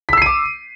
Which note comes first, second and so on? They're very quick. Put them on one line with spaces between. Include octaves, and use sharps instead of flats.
B6 E6 C7 D#7 D6